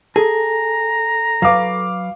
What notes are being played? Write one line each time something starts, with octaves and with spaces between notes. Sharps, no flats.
G#4 A4 A#5
F#3 B4 F5 D6